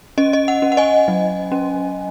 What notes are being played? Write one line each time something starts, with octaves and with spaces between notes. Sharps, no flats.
C#4 D#5
D#5
F#5
C#4
F#5
D#5 G#5
F#3
C#4